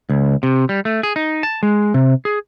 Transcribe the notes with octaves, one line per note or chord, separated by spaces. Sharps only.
C#2
C3
G3
A3
G#4
D#4
A5
G#3
C3
G#4